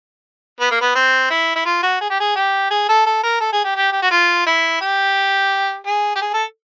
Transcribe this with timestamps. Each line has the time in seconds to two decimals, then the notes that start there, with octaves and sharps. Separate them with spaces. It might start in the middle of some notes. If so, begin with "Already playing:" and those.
0.60 B3
0.71 A#3
0.81 B3
0.95 C4
1.31 E4
1.56 E4
1.66 F4
1.83 F#4
2.01 G#4
2.10 G4
2.20 G#4
2.36 G4
2.71 G#4
2.89 A4
3.06 A4
3.23 A#4
3.41 A4
3.53 G#4
3.65 G4
3.76 G4
3.92 G4
4.02 F#4
4.11 F4
4.46 E4
4.81 G4
5.86 G#4
6.16 G4
6.21 G#4
6.33 A4